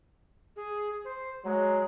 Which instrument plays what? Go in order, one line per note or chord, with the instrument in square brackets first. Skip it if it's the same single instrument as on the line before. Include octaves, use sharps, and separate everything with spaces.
[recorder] G#4
C5
[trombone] F#3 [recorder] G#3